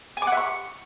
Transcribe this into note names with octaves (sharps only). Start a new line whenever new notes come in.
G#5
D6
F#5
E5
C#6